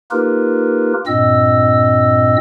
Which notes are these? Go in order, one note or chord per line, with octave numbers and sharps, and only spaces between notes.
A#3 D#4 F4 G4 A#4 B4
G2 A#2 C4 D#5 E6